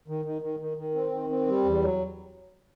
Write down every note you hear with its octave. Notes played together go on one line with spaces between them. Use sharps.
D#3
D#3
D#3
D#3
D#3
C4
D#3
C4
G3
E2
F#3